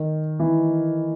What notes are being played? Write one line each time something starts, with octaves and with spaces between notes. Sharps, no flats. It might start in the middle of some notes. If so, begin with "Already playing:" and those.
Already playing: D#3
E3